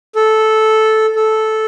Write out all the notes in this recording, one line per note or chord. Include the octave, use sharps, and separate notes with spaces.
A4
A4